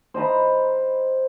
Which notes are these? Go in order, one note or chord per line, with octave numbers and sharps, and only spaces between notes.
C5 D#5 A#5 B5